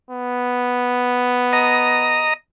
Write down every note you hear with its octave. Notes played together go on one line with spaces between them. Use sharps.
B3
D#5 A#5